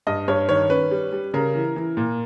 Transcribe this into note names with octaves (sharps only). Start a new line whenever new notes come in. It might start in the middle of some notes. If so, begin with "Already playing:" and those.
G2 D#5
G2 C#5
D#3 C#5
C#4 B4
G3
G3
C#3 A#4
E3
E3
A#2